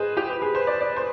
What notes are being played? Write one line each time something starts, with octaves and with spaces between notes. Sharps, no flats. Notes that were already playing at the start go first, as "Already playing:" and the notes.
Already playing: G#4 B4 C5 D#5
G4
B4
G#4
C5
D5
D5
C5